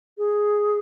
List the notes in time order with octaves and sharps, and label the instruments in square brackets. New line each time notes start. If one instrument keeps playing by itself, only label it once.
[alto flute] G#4